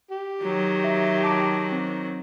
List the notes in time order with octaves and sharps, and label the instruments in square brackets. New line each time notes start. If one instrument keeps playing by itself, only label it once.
[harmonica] G4
[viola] D#3 F#3
[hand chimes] E5
A5 D6 D7
C4